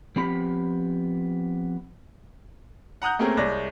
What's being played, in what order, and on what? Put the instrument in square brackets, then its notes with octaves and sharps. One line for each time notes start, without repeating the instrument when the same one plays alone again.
[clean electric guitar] F3 B3 C4 G4 B5
[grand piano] F#5 A#5 D#6 F#6 G6
A3 A#3 C4 C#4 G#4 A#4
C2 G#3 C#5 D5 A#6